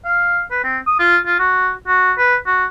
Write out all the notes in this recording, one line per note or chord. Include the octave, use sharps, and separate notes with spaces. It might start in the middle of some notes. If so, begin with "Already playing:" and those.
F5
B4
C4
D#6
F4
F4
F#4
F#4
B4
F#4